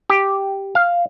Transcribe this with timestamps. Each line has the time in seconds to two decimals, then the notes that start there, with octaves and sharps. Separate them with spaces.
0.10 G4
0.75 F5